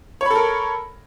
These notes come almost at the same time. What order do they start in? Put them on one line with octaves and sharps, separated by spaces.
C#5 B5 A4 A#4